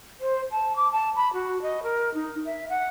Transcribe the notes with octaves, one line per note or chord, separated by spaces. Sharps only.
C5
A5
D6
A5
B5
F#4
D#5
A#4
D#4
E5
F#5